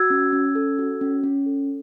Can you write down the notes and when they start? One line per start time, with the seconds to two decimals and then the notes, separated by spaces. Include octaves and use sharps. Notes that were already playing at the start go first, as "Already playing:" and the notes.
Already playing: F#4 E6 G#6
0.10 C#4
0.33 C#4
0.55 A4
0.79 F#4
1.01 C#4
1.23 C#4
1.46 A4